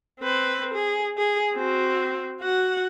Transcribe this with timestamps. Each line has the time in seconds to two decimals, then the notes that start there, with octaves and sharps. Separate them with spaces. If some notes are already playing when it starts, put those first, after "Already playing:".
0.21 C4 B4
0.74 G#4
1.18 G#4
1.54 C4 F#4
2.41 F#4 F#5